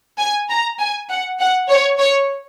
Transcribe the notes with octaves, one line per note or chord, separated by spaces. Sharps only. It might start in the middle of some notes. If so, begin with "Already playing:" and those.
G#5
A#5
G#5
F#5
F#5
C#5
C#5